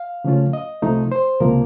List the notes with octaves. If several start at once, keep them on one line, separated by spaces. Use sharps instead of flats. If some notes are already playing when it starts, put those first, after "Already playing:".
Already playing: F5
C#3 F3 A3 C#4 F4
D#5
C2 C3 F3 A3 D#4
C5
C#2 C3 F3 A#3 A#4